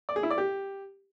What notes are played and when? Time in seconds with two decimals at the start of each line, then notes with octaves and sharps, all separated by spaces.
0.09 D5
0.16 G#4
0.23 E4
0.30 D5
0.38 G4